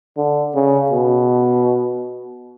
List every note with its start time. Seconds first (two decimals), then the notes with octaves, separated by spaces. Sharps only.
0.17 D3
0.55 C#3
0.92 B2